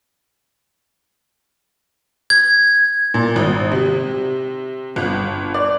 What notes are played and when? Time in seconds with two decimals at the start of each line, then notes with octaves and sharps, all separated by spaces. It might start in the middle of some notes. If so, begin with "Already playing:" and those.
2.30 G#6
3.14 A#2
3.36 G#1
3.72 C3
4.96 G1
5.54 D5